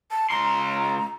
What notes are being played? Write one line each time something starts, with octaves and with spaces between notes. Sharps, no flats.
A5
C#2 A#5 C6